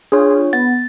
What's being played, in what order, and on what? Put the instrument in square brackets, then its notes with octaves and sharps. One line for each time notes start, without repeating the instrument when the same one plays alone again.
[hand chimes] D4 C#5 [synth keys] F4 G#4
[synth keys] B3 [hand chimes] A6